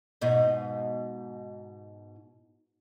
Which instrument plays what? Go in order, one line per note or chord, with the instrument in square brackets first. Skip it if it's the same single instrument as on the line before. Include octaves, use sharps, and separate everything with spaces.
[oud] G#2 B2 D#4